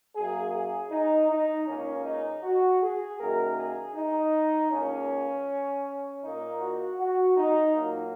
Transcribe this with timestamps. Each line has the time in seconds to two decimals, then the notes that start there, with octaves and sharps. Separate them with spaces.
0.16 F#2 F#3 A#3 G#4
0.53 G#4
0.91 D#4
1.29 D#4
1.67 C#2 C#3 A#3 C#4
2.05 D#4
2.43 F#4
2.81 G#4
3.19 F#2 D#3 F#3 A#3 A#4
3.57 G#4
3.95 D#4
4.71 C#2 C#3 A#3 C#4
6.23 A#2 A#3 D#4
6.60 F#4
6.99 F#4
7.37 D#4
7.75 A#2 F#3 A#3